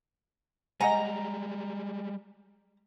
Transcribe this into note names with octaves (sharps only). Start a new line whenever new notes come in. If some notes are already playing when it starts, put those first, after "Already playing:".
G3 G#3 D#5 F#5 G#5 A#5